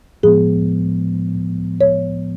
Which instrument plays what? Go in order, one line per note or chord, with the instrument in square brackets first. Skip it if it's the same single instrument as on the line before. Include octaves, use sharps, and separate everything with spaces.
[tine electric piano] A2 F3 G#3 B3 [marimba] G#4
[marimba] C#5